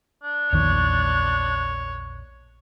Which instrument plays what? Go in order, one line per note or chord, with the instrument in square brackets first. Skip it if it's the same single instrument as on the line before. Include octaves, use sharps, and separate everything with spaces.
[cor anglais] D4
[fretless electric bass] A#1 E2 D#3 [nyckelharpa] C#5